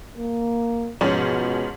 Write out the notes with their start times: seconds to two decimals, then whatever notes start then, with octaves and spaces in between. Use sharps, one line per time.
0.17 A#3
1.01 G#2 B2 F3 C#4